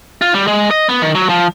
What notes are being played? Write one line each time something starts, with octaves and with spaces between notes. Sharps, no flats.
F4
G3
G#3
D#5
B3
D#3
F#3
F3